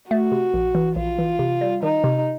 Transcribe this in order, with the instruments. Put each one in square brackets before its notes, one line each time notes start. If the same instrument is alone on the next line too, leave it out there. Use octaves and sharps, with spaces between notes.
[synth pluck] A3 [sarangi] F#4
[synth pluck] C3
A#1
E3
[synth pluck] A#1 [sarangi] F4
[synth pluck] E3
C3
G3
[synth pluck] D#3 [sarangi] D#4
[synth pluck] C3